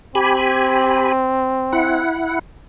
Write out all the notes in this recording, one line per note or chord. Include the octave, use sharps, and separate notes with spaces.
C4 G4 G#5 B5
E4 F#5